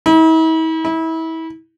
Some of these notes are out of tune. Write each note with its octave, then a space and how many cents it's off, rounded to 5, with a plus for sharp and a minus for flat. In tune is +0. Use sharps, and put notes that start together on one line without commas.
E4 -45
E4 -30